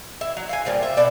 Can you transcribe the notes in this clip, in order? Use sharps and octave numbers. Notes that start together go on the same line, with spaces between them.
E4
F#3
F5 F#5 G#5
A#2 F3 G3 G4
E5
B2 D5 E5